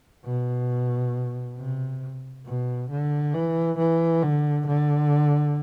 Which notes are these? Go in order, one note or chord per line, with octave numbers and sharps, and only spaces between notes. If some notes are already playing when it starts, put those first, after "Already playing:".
B2
C3
B2
D3
E3
E3
D3
D3